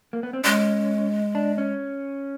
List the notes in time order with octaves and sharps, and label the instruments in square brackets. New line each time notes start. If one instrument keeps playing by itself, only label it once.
[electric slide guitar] A#3
B3
C4
[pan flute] G#3 [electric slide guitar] C#4
[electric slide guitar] D4
C#4